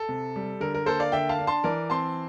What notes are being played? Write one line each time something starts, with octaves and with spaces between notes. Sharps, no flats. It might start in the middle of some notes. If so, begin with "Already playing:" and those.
Already playing: A4
C3
G3
D3 A#4
A#4
A#3 A4 C5
D5 F5
D3 E5 G5
F5 A5
D4
A5 C6
E3 A#4 D5
C4 A5 C6